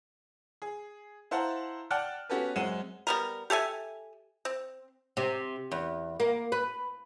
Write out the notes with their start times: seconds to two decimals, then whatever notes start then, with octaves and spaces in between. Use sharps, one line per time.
0.62 G#4
1.31 E4 C5 F5 F#5 A5 A#5
1.90 D5 F#5 G5 A5 F6 F#6
2.29 B3 C#4 F#4 G4 A4 B4
2.56 F#2 G#3 C4 F#5 D#7 E7
3.07 G3 B3 A#4
3.50 G4 A4 E5 G#5
4.45 C4
5.17 C3
5.72 E2
6.20 A#3
6.52 B4